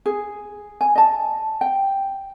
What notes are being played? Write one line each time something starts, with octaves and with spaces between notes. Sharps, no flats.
G#4
G#5
D#5 A5
G5